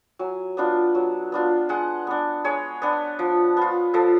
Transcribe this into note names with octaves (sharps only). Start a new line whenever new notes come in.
F#3 G#5
B3 D4 F4
F#3
B3 D4 F4
G#3 F#5
B3 D4
G#3 C#5
B3 D4
F3
B3 F4
F3 A4